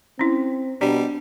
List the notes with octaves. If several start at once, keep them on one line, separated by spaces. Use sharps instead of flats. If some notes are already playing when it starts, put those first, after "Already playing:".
C4 C#4 E4
B2 G3 D4